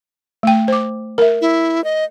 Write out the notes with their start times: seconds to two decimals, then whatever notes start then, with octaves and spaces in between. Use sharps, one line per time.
0.43 A3 G5
0.68 C5 D6
1.18 A#4 E5
1.41 E4
1.84 D#5